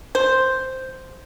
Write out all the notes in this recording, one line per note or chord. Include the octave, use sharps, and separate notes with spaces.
C5